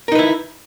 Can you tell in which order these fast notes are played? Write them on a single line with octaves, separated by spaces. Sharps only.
A#4 D#4 B4 E4